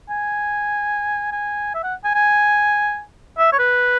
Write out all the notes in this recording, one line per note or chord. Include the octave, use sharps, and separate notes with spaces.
G#5
G#5
E5
F#5
G#5
G#5
E5
C#5
B4